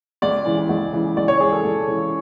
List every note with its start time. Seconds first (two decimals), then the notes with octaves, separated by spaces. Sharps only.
0.22 C#2 D5
0.46 C#3 E3
0.69 C#2
0.93 C#3 E3
1.17 C#2 D5
1.28 C#5
1.40 C#3 E3 G#4
1.53 A4
1.64 C#2
1.87 C#3 E3